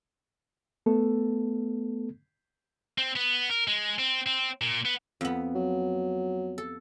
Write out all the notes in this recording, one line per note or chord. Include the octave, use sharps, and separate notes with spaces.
A3 B3 A4
C4
B3
A#4
G#3
C4
C4
A#2
B3
F2 B3
F#3
A4